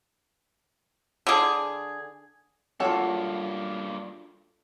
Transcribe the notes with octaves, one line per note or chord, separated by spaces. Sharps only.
D3 G#4
G2 A#3 F4 F#4 A4 C#5